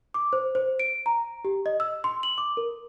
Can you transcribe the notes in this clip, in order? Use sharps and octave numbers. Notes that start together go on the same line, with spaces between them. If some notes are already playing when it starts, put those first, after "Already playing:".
D6
C5
C5
D7
A#5
G4
D#5
E6
C6
F#7
D6
A#4